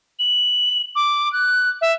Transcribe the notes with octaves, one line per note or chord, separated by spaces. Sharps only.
F#7
D6
F#6
E5